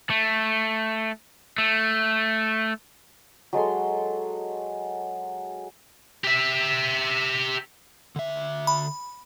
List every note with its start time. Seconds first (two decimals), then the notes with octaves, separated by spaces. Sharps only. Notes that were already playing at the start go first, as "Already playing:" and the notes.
0.10 A3
1.58 A3
3.53 F#3 G#3 A4 C6
6.24 G4 E5
8.16 D3 E5
8.67 B5